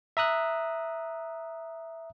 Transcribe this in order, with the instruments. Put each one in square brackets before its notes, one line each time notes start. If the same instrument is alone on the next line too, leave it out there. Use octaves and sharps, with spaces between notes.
[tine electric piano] E5 A#5 D#6 F#6